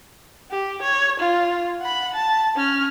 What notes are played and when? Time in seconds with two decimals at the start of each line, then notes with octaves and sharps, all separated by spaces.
0.51 G4
0.82 C#5
1.20 F4
1.82 F#5 B5
2.14 A5
2.56 C#4 F6